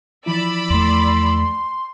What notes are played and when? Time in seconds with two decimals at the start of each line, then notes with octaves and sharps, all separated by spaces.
0.26 E3 F3 E4 D5 B5 E6
0.70 E2 A3 C6